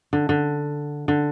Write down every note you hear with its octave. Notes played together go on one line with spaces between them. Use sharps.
D3
D3
D3